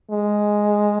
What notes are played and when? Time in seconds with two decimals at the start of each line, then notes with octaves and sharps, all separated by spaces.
0.10 G#3